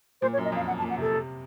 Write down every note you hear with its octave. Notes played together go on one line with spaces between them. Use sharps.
A#2 C5
C#5
F#2
D#5
F2 F5
F#2 F#5
A5
A#2
F#5
C3 A4
C3